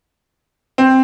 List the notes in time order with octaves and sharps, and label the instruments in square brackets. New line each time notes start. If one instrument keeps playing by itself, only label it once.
[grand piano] C4